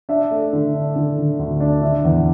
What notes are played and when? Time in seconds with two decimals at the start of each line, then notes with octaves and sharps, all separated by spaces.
0.09 D4 E5
0.31 A3
0.53 D3
0.74 D4
0.96 D3
1.18 D3
1.39 D2
1.60 D4
1.82 D3 E5
2.04 E2